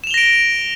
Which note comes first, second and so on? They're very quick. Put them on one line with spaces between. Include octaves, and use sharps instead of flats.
E7 F7 G7 A#6 D7